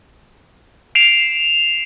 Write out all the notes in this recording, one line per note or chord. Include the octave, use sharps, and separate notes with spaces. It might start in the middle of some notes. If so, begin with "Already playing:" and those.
C7 D7 E7 F7